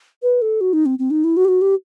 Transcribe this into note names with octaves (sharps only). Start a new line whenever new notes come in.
B4
A4
F#4
D#4
C4
C4
D#4
E4
F#4
G4
F#4
G4